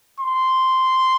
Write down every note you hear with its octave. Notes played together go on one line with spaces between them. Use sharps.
C6